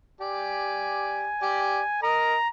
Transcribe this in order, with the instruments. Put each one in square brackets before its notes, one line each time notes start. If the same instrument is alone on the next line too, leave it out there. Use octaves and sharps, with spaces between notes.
[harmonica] G4 D5 [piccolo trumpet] G#5
[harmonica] G4 D5
[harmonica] A#4 D#5 [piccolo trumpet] A#5